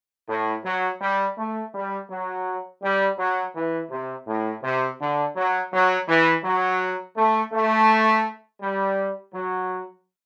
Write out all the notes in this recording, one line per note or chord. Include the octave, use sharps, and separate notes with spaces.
A2
F#3
G3
A3
G3
F#3
G3
F#3
E3
C3
A2
C3
D3
F#3
F#3
E3
F#3
A3
A3
G3
F#3